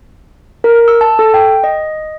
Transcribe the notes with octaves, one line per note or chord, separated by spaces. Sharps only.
A#4
E6
A5
A4
G5
D#5